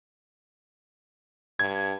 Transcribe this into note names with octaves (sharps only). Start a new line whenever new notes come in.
G2 G#6